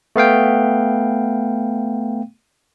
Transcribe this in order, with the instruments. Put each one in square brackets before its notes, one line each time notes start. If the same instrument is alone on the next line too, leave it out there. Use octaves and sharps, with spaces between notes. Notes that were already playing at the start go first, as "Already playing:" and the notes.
[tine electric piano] A3 B3 F5 G5